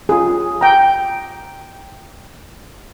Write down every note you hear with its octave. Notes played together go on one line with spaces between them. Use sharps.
F4 G#4
G5 A#5